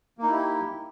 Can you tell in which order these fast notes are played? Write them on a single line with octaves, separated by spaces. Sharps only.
A#3 D#4 E4 G4